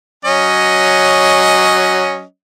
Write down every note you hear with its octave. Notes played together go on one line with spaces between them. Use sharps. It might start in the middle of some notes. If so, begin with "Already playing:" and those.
F#3 C#4 D#5